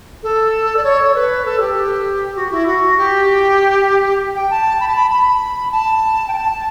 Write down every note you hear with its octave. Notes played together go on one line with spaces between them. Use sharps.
A4
D5
C#5
C#5
B4
A4
G4
G4
F#4
E4
F#4
G4
G5
A5
B5
A5
B5
B5
A5
G5
A5